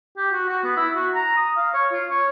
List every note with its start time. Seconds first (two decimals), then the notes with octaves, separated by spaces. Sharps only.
0.17 G4
0.32 F#4
0.49 F#4
0.64 B3
0.77 E4
0.95 F#4
1.14 A#5
1.37 D#6
1.57 F5
1.74 C#5
1.93 F4
2.10 C#5